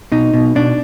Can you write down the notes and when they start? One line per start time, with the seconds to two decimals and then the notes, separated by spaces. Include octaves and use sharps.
0.12 B2 D#4
0.34 B2
0.55 B2 D4